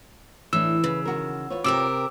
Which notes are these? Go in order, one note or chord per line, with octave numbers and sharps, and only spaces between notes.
A2 E3 D4 E6
C#3 B4
D#3 F#4 A#4
F4 B4 C#5
C3 G4 A#4 D6 E6